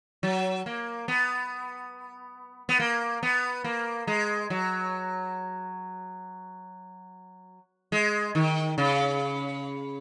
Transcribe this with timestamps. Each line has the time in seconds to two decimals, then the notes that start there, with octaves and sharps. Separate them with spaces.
0.23 F#3
0.66 A#3
1.08 B3
2.69 B3
2.80 A#3
3.23 B3
3.64 A#3
4.07 G#3
4.50 F#3
7.92 G#3
8.35 D#3
8.78 C#3